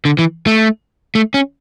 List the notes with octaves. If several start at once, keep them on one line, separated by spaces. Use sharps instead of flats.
D3
E3
A3
A3
C#4